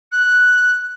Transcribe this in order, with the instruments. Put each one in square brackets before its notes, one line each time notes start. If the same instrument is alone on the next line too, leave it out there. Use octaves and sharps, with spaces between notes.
[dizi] F#6